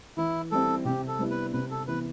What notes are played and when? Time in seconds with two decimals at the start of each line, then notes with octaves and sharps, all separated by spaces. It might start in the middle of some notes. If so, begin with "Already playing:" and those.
0.17 E3 E4
0.51 G3 C4 E4 A4
0.85 C3 G4
1.07 A4
1.19 G3 B3 E4
1.31 B4
1.53 C3 B4
1.71 A4
1.87 E3 B3 E4 B4